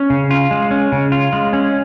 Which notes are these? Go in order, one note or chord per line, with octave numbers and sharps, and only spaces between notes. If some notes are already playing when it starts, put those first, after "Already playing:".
Already playing: C#4
C#3
F4
G#3
C#4
C#3
F4
G#3
C#4